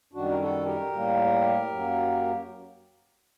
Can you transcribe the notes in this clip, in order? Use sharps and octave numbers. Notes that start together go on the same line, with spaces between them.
F#2 D#3 G3 D4 F#4
A#4
F#4 A4
G4 A#4
A2 G3 A#3
F#2 F#3 A#3